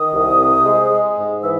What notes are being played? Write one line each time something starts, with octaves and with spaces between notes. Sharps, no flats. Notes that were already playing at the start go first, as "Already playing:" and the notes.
Already playing: D#3 D#6
C2
C3
G#3
G#3
G#2
E3 E6